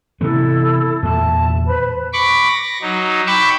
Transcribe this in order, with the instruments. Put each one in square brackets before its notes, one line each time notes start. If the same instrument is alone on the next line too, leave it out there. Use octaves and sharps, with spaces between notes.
[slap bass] C3 E3 B3 [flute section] E4 A4
[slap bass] E2 A#2 [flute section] E5 A5
[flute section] B4 C5 B5
[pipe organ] B5 C#6 D6
A#6
F#3 D#4
G5 B5 C#6 D6 E6